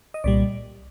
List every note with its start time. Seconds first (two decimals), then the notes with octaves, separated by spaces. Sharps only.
0.14 D#5
0.24 C2 A#2 G3 D5